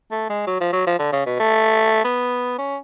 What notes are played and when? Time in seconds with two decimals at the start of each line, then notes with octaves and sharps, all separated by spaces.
0.11 A3
0.30 G#3
0.47 F#3
0.61 F3
0.73 F#3
0.87 F3
0.99 D3
1.12 C#3
1.26 B2
1.39 A3
2.05 B3
2.58 C#4